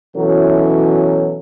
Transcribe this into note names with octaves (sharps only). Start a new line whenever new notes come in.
B2 E3 F#3 C#4 E4 A4